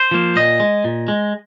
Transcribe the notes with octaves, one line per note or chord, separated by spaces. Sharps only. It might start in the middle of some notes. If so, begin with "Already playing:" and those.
Already playing: C5
F3 A#3
A#2 D#5
G#3
A#2
G#3